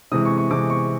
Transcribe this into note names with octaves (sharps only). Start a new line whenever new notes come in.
C3 E3 G#3 D#6
C#6
C#6
C3 E3 G#3 D6
C#6